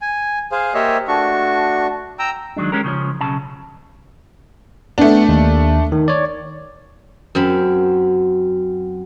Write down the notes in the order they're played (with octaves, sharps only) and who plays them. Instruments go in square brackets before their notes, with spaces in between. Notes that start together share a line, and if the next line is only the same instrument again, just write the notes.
[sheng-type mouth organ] G#5
G#4 C5 F5
A#3 G4 C5 C#5 D#5 E5
A3 D4 F#4 C#6
G5 A#5 E6
[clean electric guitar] D#3 F3 F#3 G#3 D4
G#3 C#4 G4 A#4
C#3 F3 C#4
B1 C#3 A5
[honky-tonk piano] A3 D4 [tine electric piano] B3
[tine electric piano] D#2
D#3
C#5 D5
[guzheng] F#2 C4 B5